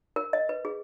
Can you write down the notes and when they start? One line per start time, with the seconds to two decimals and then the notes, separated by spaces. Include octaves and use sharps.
0.16 A#4
0.33 D#5
0.49 B4
0.65 G#4